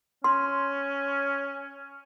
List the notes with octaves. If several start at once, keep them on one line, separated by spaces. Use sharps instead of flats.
C#4 C6